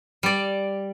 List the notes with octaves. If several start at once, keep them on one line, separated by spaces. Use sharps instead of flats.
G3 D5